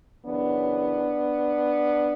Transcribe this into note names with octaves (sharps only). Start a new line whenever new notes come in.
F#2 C#3 E3 B3 D4